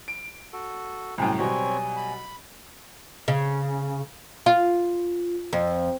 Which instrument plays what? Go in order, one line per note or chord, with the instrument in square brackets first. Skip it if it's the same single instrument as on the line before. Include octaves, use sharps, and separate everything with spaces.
[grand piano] D7
[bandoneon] F#4 A4
[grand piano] C2 F#2 A2 [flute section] C5 G5 G#5
[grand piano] B2 F#3 G3 [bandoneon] C4 C#5 [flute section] G#5
[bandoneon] B5
[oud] C#3
F4
F2